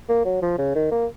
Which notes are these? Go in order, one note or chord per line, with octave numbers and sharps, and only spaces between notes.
A#3
F#3
F3
C#3
D#3
A#3